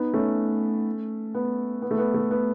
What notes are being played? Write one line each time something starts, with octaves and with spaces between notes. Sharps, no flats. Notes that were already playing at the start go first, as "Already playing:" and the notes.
Already playing: B3 D#4
A3 C#4
B3
B3
A3
B3
A3
B3